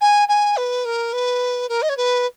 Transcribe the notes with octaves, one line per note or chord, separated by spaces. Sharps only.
G#5
G#5
B4
A#4
B4
A#4
D#5
C#5
B4